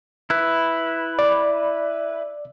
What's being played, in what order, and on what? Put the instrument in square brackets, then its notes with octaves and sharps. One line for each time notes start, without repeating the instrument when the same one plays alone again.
[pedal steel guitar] E4 B4
[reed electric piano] D5